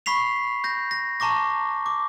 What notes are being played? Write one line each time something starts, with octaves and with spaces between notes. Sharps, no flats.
B5 C#6 B6 C7 F7
G6 A#6
A#6
A5 A#5 C#6 D6 A#6
D6